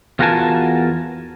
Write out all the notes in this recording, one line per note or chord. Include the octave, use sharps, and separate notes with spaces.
E2 F4 F#4 A#4 G#5 A5